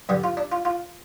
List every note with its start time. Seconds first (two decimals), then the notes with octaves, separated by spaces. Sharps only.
0.09 G2 D3 G3 G4
0.24 F4
0.37 D4
0.52 F4
0.65 F4